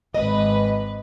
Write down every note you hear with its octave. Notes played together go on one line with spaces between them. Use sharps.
G#1 B4 D#5